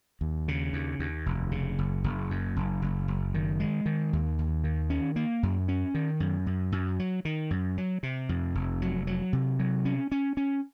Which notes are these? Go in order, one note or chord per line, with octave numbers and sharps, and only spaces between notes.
D#2
C#3
D#2
D#2
F1
C#3
F#1
F#1
F#2
F#1
F#1
F#1
D#3
G#3
D#3
D#2
D#2
D#3
C#4
A#3
F#2
C#4
D#3
F#2
F#2
F#2
F#3
D#3
F#2
F#3
C3
F2
F1
F#3
F#3
C3
F#3
C#4
C#4
C#4